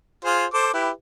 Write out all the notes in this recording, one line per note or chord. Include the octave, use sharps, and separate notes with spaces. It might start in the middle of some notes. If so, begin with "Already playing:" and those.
F4 G#4 C5
A4 C5 D6
E4 G4 B4